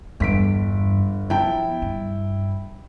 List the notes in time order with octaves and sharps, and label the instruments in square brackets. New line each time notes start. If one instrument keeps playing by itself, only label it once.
[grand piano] G1 B6 D7 [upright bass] E2 G2
[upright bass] F3 B3 [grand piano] E4 G5 A5
[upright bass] G2